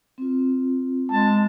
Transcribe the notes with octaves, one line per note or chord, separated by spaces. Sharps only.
C4 F4
G#3 A5